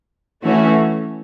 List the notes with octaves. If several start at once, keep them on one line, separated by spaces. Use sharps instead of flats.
E3 A3 C#4 F#4